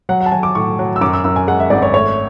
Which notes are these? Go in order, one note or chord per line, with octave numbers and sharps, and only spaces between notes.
F#3 F#5
F#5
A5
F#3 G#5
D6
A2 C#6
F#3
E6
F#2 D6
E6
F#2 E6
G#5
G#3 F#5
E5
G#1 D5
C#5
A3 C#5